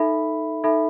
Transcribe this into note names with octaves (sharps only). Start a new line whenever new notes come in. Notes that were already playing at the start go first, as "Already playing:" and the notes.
Already playing: D#4 A4 E5 B5
D#4 A4 E5 B5